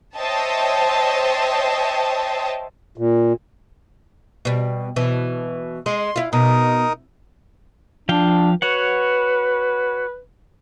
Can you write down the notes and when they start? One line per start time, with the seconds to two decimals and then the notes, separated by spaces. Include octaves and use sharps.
0.16 C5 C#5 D#5 E5 G5 A5
2.98 A#2
4.45 B2 G3
4.96 B2 E3
5.86 G#3 C6
6.16 E4 F4
6.33 B2 D#4 A#4 D#6
8.09 F3 D4 F5 G5
8.62 F#4 B4 C#5 F#5